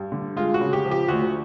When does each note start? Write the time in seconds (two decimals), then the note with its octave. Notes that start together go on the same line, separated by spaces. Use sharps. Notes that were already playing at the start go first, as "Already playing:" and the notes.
Already playing: G2
0.12 D3
0.36 G#3 F4
0.54 F#4
0.61 C#3
0.73 G4
0.85 F3
0.91 G4
1.08 D2 F#4